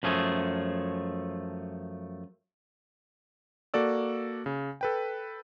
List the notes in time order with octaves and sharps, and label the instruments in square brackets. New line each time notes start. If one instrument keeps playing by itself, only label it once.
[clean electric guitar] F#2 F3 A3 G#4
[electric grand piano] A#3 F#4 A4 D5 E6
C#3
A4 B4 G5